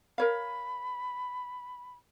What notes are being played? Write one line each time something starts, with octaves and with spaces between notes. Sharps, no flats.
A#4 C#5 F5 B5